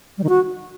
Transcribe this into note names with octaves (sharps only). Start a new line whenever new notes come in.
G3
D#3
F#4